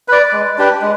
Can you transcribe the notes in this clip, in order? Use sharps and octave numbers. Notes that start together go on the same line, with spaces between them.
B4 D5
G#3
D4 G4 B4
G#3